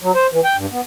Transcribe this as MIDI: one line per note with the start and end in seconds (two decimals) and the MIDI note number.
0.02 0.12 54
0.15 0.27 72
0.32 0.40 52
0.44 0.56 79
0.57 0.66 43
0.72 0.81 59